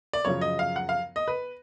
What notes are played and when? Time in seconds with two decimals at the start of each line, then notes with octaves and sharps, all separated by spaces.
0.13 D5
0.25 F#2 C#3 F3 C#5
0.41 D#5
0.59 F5
0.76 F#5
0.89 F5
1.16 D#5
1.28 B4